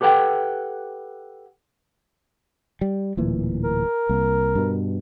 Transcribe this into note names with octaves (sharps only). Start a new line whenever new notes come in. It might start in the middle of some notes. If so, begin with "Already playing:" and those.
G4 A4 B4 F#5 G5
G3
D1 A#2 E3
A#4
C2 A#3
G2 B2